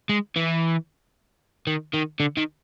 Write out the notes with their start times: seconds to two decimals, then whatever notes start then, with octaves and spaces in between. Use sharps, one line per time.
0.09 G#3
0.36 E3
1.67 D#3
1.94 D#3
2.20 D3
2.37 D#3